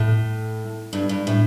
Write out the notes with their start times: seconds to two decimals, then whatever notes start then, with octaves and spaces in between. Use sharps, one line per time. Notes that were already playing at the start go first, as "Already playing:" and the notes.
Already playing: A2
0.93 G2
1.09 G2
1.27 A2